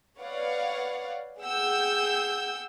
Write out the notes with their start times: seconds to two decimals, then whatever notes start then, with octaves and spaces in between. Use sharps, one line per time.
0.21 B4 C#5 D5 F5 F#5
1.42 G#4 F#5 G5 E6 G6